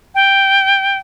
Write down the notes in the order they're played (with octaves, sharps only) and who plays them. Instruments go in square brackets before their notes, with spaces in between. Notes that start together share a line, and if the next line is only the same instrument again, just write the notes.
[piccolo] G5